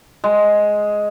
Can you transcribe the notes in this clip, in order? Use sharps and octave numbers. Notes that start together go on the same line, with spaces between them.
G#3